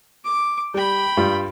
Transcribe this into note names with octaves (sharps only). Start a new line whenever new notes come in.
D6
G3 G5 B5
G2 F4 D5